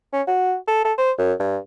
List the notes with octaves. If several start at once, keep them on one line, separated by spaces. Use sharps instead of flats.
C#4
F#4
A4
A4
C5
F#2
G2